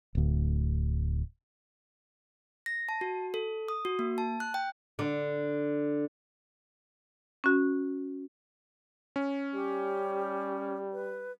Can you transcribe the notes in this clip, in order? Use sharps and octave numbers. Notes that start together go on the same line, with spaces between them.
D1 D2
A#6
A5
F#4
A4
D#6
F#4
A#3
A5
F#6
G5
D3
C#4 F#4
C#4
G3 G4
B4